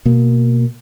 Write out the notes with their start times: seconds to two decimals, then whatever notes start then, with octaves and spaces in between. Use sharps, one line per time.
0.05 B2 A#3